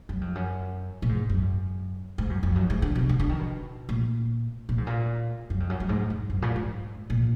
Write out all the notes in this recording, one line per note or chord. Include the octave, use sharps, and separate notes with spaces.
F#2
F2
F#2
A#2
G#2
F#2
G#2
F#2
F2
F#2
G#2
D3
B2
D3
D3
D#3
B2
A#2
A#2
G#2
A#2
F#2
F2
F#2
F#2
G#2
F2
F#2
A#2
G#2
A#2